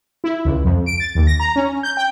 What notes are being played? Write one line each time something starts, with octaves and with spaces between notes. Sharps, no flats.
E4
C#2
F2
D7
A6
D#2
A#6
A#5
C#4
G6
G5